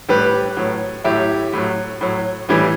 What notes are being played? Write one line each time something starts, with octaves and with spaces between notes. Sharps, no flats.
A2 G3 G4 B4
A2 F#3
A2 F#3 E4 G4
A2 F#3
A2 F#3
A2 E3 G3